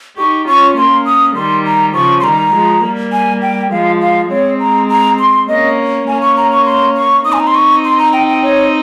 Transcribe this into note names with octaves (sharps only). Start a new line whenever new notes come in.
D#4 G4 C#6
C#4 F4 C#6
A#3 C#4 C6
D#6
D#3 G3 C6
A#5
C#3 F3 C#6
C6
D#3 G3 A#5
F3 G#3
G3 A#3
G#5
G5
F3 G#3 F5
F5
G#3 C4 C#5
A#5
A#5
C6
A#3 C#4 D#5
A#3 C#4 G#5
C#6
A#5
C#6
C6
C#6
C4 D#4 D#6
G#5
A#5
C6
C#6
C6
A#5
G5
G5
C#5